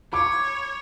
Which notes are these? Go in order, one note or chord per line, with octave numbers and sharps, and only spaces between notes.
C#5 B5 D6